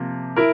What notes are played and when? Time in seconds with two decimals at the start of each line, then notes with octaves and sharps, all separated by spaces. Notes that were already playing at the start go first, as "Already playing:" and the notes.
Already playing: C3 F3 A#3
0.36 E4 A#4